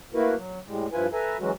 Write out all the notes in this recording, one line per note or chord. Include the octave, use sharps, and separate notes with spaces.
A3 A#3 E4 F#4 A#4 B4
F#3
A2 G3 G#3
G2 F3 E4 F4 B4 G#5
A4 B4 E5 G#5 A#5
E3 F#3 G#3 C#4 F#4